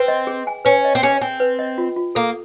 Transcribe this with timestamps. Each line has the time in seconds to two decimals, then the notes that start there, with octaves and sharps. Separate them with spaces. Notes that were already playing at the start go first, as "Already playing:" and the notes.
Already playing: C4 B4
0.08 D#5
0.27 G#4
0.47 G#5
0.65 C#4 B4
0.85 D#5
0.95 C4
1.03 C#4 G#4
1.21 C4 G#5
1.40 B4
1.59 D#5
1.78 F4
1.96 F4
2.15 A#3 A4